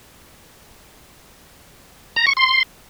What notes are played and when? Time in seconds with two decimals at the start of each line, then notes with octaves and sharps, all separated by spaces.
2.16 A#5
2.27 C#6
2.37 C6